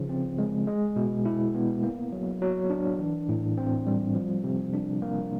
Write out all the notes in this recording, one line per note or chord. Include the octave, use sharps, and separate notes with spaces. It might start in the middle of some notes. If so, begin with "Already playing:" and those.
Already playing: C#3 F3
C4
G#3
G#3
B2
E4
B3
A#3
F#3
F#3
D4
E3
A2
C4
G3
F3
C3
D4
A#3